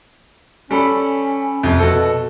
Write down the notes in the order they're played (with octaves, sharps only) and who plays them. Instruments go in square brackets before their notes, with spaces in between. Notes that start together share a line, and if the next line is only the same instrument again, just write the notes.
[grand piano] G3 A4 B5 [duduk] C#4
[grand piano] F2 C3
[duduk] B2 [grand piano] F#4 A4